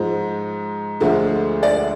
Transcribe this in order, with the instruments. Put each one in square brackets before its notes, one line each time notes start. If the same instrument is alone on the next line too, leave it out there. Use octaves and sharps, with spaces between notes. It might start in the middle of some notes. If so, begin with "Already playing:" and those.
Already playing: [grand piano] G#2 F3 G#3
D2 D3 F3 G#3
D5